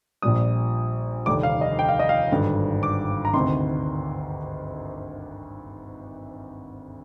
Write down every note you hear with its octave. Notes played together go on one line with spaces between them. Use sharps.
A#1 A#2 G3 D#6
F1 D#2 D3 G3 D6
F5
D#5
G5
F5
D#5
F5
G#1 G2 D3
D6
A#5
D2 C3 D#3 C6